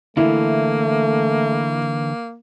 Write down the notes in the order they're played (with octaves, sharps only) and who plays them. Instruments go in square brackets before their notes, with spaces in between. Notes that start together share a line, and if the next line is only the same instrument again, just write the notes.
[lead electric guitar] D3 E3 [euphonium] A3 [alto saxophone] A#3 [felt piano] E4